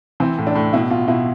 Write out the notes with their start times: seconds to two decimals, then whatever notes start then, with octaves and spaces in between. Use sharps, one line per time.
0.20 E3 C4
0.38 A2
0.47 D4
0.55 A2
0.73 B2 E4
0.90 B2 F4
1.08 B2 E4